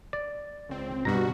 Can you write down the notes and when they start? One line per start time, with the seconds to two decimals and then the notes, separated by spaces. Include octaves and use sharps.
0.13 D5
0.69 C#2 C4
1.05 G2 B2 F#4 A#5